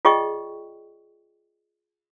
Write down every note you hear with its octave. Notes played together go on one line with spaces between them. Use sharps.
F4 G#4 D5 D#5 G5 C#6